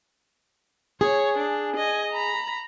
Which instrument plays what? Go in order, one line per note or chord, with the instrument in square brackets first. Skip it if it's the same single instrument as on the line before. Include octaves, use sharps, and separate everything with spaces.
[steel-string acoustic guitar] G#4 [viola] C#5
[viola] D4
D#5 G#5
A#5 B5